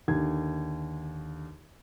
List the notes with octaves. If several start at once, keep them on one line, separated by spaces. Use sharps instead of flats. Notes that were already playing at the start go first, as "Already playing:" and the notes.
D#2 D3 G#6